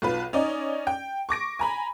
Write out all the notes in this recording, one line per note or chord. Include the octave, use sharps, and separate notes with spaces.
B1 F4 B4
C#4 D#4 D5 D#5
G5
C#6 D6 A#6 D7
G#5 A#5 B5